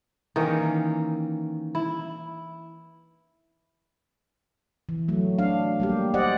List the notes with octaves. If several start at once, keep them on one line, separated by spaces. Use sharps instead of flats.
D#3 E3 A#3 C#4
E4
E3
F#3 A3
D4 F5
G3 A#3 G4
G4 C5 D5 D#5 F#5